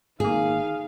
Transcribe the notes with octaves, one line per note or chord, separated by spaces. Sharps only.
G#1 A#3 D#4 G#4 F5